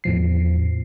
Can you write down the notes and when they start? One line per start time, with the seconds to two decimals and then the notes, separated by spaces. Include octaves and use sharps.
0.04 E2 A2 F3 C7